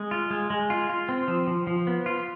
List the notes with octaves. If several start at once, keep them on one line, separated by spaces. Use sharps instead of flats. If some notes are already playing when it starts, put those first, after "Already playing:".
Already playing: G#3
F4
G#3
G#3
F4
F4
C4
F3
F3
F3
B3
F4